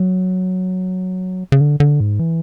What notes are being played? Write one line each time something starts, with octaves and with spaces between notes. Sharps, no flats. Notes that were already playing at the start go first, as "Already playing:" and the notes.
Already playing: F#3
C#3
D3
D3
G#2
E3